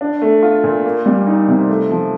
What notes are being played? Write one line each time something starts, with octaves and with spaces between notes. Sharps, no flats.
D4
A3
F4
A#2
A#3
G3
D#4
C3
A3
F3